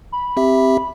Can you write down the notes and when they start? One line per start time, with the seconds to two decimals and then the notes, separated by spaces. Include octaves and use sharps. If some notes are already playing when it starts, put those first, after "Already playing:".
0.12 B5
0.37 C4 G4 E5